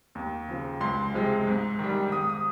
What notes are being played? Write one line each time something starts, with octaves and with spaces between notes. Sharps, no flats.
D#2
C#3 F3
C#2 C6
C3 F3 G#3
G#2
D#3 G3
G#2 D#6
D#6